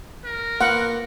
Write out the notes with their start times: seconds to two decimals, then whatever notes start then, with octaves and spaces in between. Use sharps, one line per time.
0.25 A#4
0.61 A#3 F4 B4 F#5